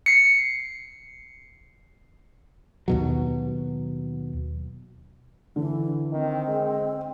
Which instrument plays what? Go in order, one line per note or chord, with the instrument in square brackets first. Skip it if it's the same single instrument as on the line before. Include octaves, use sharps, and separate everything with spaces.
[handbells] C7 C#7
[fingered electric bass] D#2 B2 F#3
[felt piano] D3 [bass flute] E3
[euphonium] D#3 [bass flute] C4
[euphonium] G#3